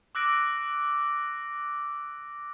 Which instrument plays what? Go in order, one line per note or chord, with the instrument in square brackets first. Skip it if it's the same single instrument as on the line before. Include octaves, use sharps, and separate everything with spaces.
[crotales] D6 E6 F#6 A#6 D7